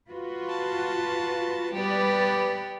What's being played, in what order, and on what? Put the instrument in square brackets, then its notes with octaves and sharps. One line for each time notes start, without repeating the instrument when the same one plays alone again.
[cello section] F4 F#4 B4
[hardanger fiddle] A5
[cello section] G3 B4 D5 [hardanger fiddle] B3 G4